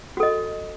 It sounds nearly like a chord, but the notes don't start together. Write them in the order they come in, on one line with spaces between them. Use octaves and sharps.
F#4 A4 D#5